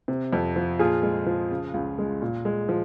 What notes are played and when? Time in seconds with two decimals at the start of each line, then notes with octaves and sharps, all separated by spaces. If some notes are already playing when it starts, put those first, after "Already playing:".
0.08 C3
0.33 F2
0.56 F3
0.79 A#2 F4 G#4
1.03 G#3
1.26 F3
1.51 C#3
1.74 C#2
1.98 G#3
2.22 A#2
2.45 G#3
2.69 F3